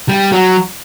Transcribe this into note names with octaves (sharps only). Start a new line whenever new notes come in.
G3
F#3